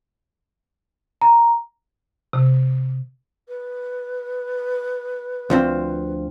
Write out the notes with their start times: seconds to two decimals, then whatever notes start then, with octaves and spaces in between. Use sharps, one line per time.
1.22 A#5
2.33 C3
3.48 B4
5.50 D2 F3 C4